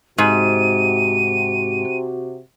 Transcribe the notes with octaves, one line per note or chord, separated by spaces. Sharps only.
G#2 C3 F#4 D#7